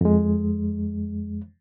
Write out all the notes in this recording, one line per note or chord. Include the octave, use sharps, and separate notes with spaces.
F2 G#3